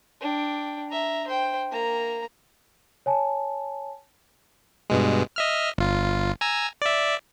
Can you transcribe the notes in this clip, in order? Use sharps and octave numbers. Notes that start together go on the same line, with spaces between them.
D4 G5
E5 A#5
C5 G5
A#3 A#5
C#5 G#5 A5
G2 B2 G#3
D#5 E5 F6
G1 F4
G#5 A#5 E6
D5 E5